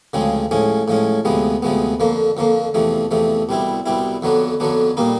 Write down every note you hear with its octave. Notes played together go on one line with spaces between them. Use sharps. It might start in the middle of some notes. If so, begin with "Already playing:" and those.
D2 C#3 F3 G#3 C4
A2 F3 G#3 C#4
A2 F3 G#3 C#4
D2 C3 F3 G#3 B3
D2 C3 F3 G#3 B3
F2 D3 F3 A#3
F2 D3 F3 A#3
E2 C3 F3 A3
E2 C3 F3 A3
C2 B2 G3 C4 E4
C2 B2 G3 C4 E4
F2 D3 F#3 B3 D4
F2 D3 F#3 B3 D4
A#2 G3 A#3 D#4